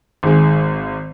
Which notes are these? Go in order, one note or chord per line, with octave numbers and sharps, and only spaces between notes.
G#1 G#2 G#3